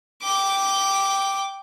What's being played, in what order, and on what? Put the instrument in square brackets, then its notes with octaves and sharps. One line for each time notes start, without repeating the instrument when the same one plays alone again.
[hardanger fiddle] G5 D6